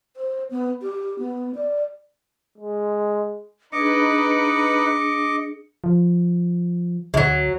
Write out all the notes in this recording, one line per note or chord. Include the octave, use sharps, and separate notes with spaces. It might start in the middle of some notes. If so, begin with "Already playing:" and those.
C5
B3
G4
B3
D5
G#3
D4 D#4 G#4 B4 D#5 D6 C#7
F3
D2 F#3 G#3